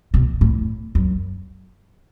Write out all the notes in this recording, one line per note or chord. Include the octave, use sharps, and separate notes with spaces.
B2
A2
F#2